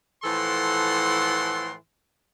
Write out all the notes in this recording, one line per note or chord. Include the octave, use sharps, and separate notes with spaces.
A2 E3 F3 A4 F#5 C6